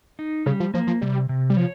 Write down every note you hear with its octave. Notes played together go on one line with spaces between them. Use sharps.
D#4
C#3 G3
F3
F3 A#3
F3
C3 G3
C3
G3
F3 C#5